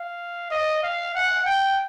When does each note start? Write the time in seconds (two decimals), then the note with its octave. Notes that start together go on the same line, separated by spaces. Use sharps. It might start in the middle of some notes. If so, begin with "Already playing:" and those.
Already playing: F5
0.50 D#5
0.83 F5
1.14 F#5
1.46 G5